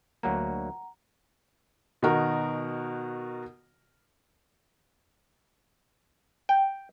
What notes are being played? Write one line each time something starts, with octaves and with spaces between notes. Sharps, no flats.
D2 F#3 A#3 F#5 A#5
B2 D#3 D#4 F#4 A#4
G5